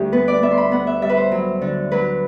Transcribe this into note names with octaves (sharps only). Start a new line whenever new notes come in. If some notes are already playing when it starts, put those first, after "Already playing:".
Already playing: D2 G3 G4
B3 B4
D5
B3 E5
C6
B5
B3 F#5
E5
G3 E5
B4
C5
F#3
D3
F#3 B4